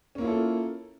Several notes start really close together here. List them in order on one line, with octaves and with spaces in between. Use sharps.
C#4 A#3 E4 F4 A4